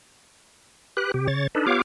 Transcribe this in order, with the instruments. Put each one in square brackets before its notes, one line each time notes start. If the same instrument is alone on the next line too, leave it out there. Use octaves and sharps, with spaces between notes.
[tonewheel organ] G4 B4 F#6
C3 G4
C#3 C#5 A6
D4 D#4 A4 B4
B3 F4 G4 C#5 F5 D6